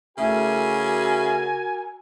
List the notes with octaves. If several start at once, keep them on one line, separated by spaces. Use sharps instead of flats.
C#3 A3 E4 F#4 A#4 G#5